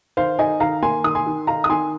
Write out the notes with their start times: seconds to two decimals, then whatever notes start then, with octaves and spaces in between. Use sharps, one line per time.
0.17 D#3 C5 F5
0.39 D#4 D#5 G#5
0.60 D#3 F5 A#5
0.82 A#3 G#5 C6
1.04 D#3 D#6
1.15 G#5 C6
1.26 D#3
1.47 D#4 F5 A#5
1.64 D#6
1.69 D#3 G#5 C6